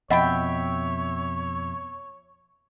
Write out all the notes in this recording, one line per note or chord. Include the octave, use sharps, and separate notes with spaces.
F2 B2 C#5 D#5 E5 F#5 G5 B5